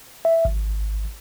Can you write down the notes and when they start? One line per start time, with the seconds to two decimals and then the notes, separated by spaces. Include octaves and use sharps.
0.25 E5
0.45 G#1